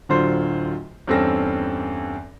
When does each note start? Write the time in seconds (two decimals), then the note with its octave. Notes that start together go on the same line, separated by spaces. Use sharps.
0.09 D1 D3 F#3 F4 C5 C6
1.07 E2 G2 C4 C#4 A4 A#6